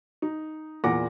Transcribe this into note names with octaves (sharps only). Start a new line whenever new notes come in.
D#4
E2 A#2 F#5 D6 A#6